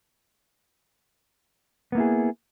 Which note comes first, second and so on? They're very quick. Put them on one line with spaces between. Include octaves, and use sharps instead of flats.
B3 A#3 E4 G#4